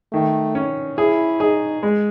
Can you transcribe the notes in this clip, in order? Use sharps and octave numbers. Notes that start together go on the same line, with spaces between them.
D#3 A3
C#4
E4 G#4
D#4 G#4
G#3